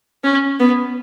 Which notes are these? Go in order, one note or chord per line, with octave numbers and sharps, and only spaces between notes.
C#4
B3